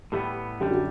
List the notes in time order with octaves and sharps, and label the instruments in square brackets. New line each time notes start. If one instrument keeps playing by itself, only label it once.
[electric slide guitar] A2 E3 G3 B3 [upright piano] G4
[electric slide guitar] F#2 D3 G3 [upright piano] G4
[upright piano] F#4